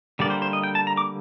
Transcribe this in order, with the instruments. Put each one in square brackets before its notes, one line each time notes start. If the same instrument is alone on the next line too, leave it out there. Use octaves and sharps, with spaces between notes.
[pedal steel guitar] D3 G3 A#3 D5
C5
C5
D#5
G5
A5
A#5
D6